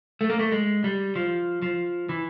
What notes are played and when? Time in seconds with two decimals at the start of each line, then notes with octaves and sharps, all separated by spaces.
0.21 A3
0.30 A#3
0.39 A3
0.52 G#3
0.84 G3
1.16 F3
1.62 F3
2.09 E3